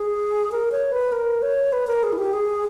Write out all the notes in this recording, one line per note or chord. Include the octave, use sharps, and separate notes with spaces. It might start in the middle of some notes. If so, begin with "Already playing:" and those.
Already playing: G#4
A#4
C#5
B4
A#4
C#5
B4
A#4
G#4
E4
G4
G#4